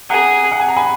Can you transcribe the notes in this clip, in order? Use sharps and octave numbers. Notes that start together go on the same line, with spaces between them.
G#4 F#5 A#5
F#5
G#5
A#5
G#5 B5